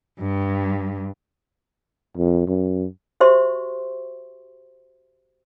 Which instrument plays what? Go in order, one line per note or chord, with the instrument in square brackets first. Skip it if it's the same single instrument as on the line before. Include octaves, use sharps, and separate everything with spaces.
[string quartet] G2
[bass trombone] F2
F#2
[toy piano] F#4 G4 C5 E5 C6 C#6